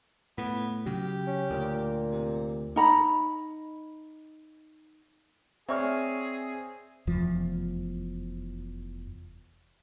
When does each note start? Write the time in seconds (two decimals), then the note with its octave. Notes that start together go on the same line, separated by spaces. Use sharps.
0.38 A2 B3
0.86 C#3 F#3 G4
1.27 C#4
1.51 D2 A#2
2.11 C3
2.76 D#4 A#5 B5
5.69 C4 G#4 C#5 D5 E5 C#6 F6
7.07 F1 E2 F3